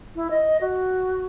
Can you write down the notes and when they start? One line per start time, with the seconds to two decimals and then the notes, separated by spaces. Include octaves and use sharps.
0.15 E4
0.31 D#5
0.61 F#4